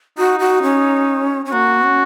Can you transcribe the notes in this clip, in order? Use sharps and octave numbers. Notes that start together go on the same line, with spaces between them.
D#4 F#4
F#4
C#4
C#4
A#3 F#4
C#4